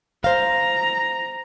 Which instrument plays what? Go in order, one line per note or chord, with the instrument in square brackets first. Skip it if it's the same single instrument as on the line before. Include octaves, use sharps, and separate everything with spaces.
[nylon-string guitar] C5 F5 [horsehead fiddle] A#5